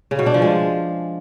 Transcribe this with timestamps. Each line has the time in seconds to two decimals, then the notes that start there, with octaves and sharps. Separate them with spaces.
0.11 C#3
0.19 B2
0.26 D4
0.34 F3
0.42 G#3